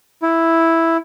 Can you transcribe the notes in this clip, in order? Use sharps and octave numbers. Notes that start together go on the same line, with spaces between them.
E4